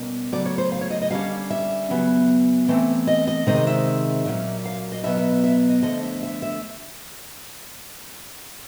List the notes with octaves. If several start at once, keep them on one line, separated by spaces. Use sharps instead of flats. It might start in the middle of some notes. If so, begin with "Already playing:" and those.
Already playing: B2 G3 A#3 C#4
C#3 F#3 A3 D5
C#5
C5
F5
C#5
D#5
D#5
D3 G3 A#3 C#4 F5
E5
C#3 F#3 B3
E3 A3 C4
D#5
D#5
C3 D#3 G#3 C4 D#5
E5
A#2 F#3 A#3 C#4
F5
D#5
B2 F#3 B3 E5
E5
E5
E5
D#5
D3 F3 A3 D#5
E5
E5
E5